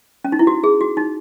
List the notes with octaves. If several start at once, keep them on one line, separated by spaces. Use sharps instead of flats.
C#4
D#4
E4
F#4
G#4
F#4
D#4